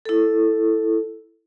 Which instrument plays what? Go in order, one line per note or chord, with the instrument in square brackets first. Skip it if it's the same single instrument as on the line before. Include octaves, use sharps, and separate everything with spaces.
[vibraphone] E4 A4